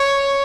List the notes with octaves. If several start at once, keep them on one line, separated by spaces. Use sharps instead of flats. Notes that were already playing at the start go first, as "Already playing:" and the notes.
Already playing: C#5